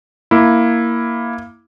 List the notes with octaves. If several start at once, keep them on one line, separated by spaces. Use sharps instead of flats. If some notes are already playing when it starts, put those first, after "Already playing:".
A#3 E4